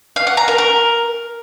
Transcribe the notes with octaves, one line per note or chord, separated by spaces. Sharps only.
F5
F#5
A#5
A#4
A#4